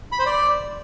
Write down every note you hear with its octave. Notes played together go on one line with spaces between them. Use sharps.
B5
C5
D5